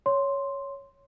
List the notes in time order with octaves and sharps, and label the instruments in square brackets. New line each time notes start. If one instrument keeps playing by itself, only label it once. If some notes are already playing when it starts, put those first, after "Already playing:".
[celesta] C#5 C6